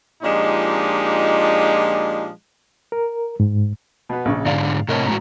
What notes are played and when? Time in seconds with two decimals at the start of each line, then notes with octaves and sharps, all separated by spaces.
0.23 A#2 F3 G#3 D4 D#4 G4
2.92 A#4
3.40 G#2
4.09 B2 B3
4.25 A#1 C#3 C#6
4.46 G#2 D3 G#3 D5 F5
4.89 A2 C3 A#4 C#5 D#5 A5
5.07 A2 G#3 F#4 A#5